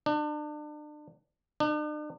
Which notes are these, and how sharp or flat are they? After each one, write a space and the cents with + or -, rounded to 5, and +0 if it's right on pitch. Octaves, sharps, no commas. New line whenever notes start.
D4 +35
D4 +45